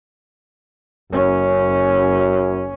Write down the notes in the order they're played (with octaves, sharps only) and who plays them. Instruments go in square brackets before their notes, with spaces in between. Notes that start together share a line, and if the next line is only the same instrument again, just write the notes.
[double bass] F#1 C#4 [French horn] F#2